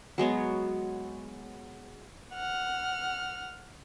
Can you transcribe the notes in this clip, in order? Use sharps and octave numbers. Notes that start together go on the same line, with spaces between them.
F#3 G#3 B3 C#5
F#5 F6